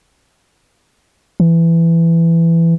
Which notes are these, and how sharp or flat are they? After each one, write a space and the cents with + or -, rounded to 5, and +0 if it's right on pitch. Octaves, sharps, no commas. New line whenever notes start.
E3 +15